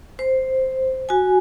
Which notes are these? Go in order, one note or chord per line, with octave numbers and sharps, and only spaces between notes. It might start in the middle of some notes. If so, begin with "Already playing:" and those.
C5
F#4 G#5